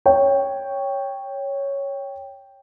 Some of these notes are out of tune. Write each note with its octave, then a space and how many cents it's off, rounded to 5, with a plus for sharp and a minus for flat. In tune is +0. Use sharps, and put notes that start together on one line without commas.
C#5 +0 G5 +0